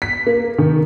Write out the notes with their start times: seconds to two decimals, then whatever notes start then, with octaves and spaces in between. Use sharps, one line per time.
0.02 B6
0.27 A#3
0.58 D#3